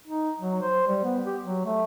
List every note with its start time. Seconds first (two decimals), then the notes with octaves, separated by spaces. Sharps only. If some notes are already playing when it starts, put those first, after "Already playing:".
0.08 D#4
0.40 F#3
0.62 C5
0.87 G3
1.04 B3
1.26 G4
1.43 F#3
1.65 A3